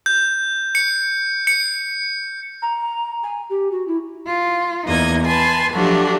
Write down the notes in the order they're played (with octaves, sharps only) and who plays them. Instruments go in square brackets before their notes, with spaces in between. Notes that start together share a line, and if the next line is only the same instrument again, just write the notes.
[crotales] G6
C#7
C#7
[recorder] A#5
G#5
G4
F#4
E4
[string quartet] F4
E2 A#3 D#4 D#5 G#6
B4 G#5 A5 C6
F3 F#3 A3 D4 F#4 G4